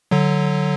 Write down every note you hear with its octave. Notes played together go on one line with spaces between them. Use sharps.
D3 F#3